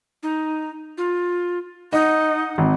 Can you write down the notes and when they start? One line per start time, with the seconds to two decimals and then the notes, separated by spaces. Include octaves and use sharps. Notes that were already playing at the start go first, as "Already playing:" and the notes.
0.23 D#4
0.98 F4
1.93 D#4 D#5 F#5
2.58 G#1